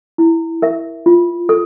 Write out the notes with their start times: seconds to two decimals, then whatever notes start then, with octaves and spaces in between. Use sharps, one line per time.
0.18 E4
0.62 A#4 E5
1.06 F4
1.49 A4